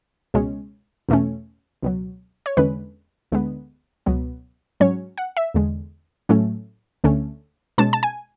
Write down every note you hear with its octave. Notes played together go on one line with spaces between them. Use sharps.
C#2 B2 G#3 C#4
E2 B2 A3 C#4
C#2 B2 F#3
C#5
E2 D3 G#3 C#4 B4
D2 D3 G#3 B3
C#2 B2 F#3 B3
G#2 F#3 C#4 C#5
F#5
E5
E2 D3 G#3
A2 F#3 A3 C#4
D2 D3 A3 C#4
B2 G#3 C#4 A5
A5
G#5